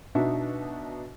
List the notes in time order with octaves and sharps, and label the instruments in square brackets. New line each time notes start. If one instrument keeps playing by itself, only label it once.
[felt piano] B2 D4 D#4 F#4 E5